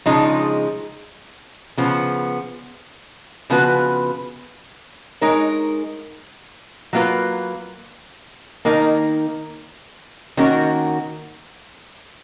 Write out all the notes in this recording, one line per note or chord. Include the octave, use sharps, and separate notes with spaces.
C#3 F3 G#3 D#4
C#3 F3 B3
C#3 F3 B3 F#4 B4
G#3 D#4 A#4 C#5
F#3 A#3 F4 B4
D#3 A#3 D#4 A#4
D#3 A#3 C#4 F#4 A#4